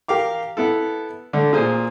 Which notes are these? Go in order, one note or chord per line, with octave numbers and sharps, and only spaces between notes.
G4 A#4 F5 D6
B3 E4 A4
D3 A3 D4
A#2 G#4 C5